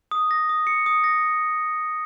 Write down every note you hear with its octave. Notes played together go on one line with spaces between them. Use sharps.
D#6
A#6
D#6
C#7
D#6
A#6